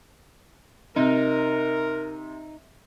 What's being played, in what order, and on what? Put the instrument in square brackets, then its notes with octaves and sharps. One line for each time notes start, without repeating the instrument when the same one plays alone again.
[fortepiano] C3 [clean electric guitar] D#4 [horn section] A#4